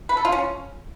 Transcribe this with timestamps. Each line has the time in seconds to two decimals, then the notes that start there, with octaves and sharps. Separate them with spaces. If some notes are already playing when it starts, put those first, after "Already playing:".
0.09 B4
0.17 A4
0.25 F4
0.32 C#4